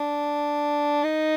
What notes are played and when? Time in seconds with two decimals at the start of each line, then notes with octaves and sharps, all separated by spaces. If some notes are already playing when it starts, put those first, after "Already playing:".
Already playing: D4
1.04 D#4